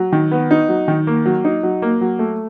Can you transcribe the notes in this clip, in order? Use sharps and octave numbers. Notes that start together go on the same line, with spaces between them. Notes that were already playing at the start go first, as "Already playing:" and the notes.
Already playing: F#3
D#3
B3
D#4
F#3
D#3
A#3
F#3
D#4
F#3
A#3
F#3
A3